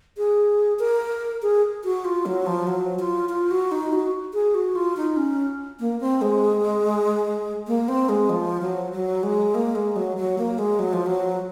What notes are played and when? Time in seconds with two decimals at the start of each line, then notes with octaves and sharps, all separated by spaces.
0.17 G#4
0.79 A#4
1.42 G#4
1.84 F#4
2.05 F4
2.26 F#3
2.46 F3
2.67 F#3
2.99 F4
3.29 F4
3.51 F#4
3.72 D#4
3.92 F#4
4.34 G#4
4.55 F#4
4.75 F4
4.97 D#4
5.17 C#4
5.80 A#3
6.00 C4
6.22 G#3
7.67 A#3
7.88 C4
8.09 G#3
8.30 F3
8.61 F#3
8.92 F#3
9.23 G#3
9.55 A#3
9.75 G#3
9.96 F#3
10.17 F#3
10.38 A#3
10.59 G#3
10.79 F#3
10.93 F3
11.06 F#3